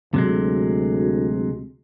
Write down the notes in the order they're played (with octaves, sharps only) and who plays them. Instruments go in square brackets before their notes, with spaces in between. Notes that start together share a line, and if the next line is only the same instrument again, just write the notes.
[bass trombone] D2 [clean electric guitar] C3 F#3 G#3